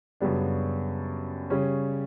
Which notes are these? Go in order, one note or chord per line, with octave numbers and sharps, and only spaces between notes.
F#2 C#3 G3 B3 D4
C#3 G3 C#4